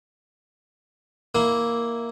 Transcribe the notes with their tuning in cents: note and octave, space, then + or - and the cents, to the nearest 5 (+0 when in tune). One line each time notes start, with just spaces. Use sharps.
A#3 +0 E4 +0